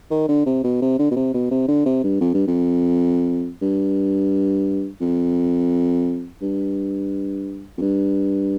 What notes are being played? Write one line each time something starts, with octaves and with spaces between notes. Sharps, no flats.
D#3
D3
C3
B2
C3
D3
B2
C3
B2
C3
D3
C3
G2
F2
G2
F2
G2
F2
G2
F2
G2